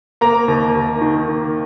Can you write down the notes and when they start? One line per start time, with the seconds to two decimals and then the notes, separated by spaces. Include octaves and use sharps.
0.21 A#3 A#5
0.48 D#2
0.75 D#2
1.01 D#3
1.27 A#3